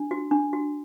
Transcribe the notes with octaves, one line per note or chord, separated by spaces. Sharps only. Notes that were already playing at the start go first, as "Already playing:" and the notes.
Already playing: D4
F#4
D4
F#4